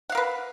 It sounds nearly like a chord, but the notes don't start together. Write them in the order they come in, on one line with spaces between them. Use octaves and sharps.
F#5 F5 A#4 B4